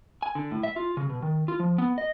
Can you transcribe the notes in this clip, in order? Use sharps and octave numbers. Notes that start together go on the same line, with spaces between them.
G#5
D3
A2
E5
F4
C#3
B2
D#3
F4
F3
B3
D#5